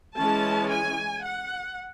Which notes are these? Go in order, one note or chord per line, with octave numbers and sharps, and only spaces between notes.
E3 G#3 C#4 A5
G#5
F#5